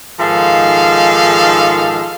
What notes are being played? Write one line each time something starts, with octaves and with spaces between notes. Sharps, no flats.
G#2 D#3 F3 G#4 A4 F5